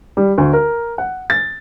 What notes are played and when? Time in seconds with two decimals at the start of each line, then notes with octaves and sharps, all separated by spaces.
0.17 G3
0.38 D2
0.53 A#4
0.98 F#5
1.30 A6